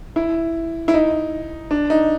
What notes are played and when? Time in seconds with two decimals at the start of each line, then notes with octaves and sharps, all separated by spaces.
0.16 E4
0.88 E4
0.94 D#4
1.71 D4
1.90 D#4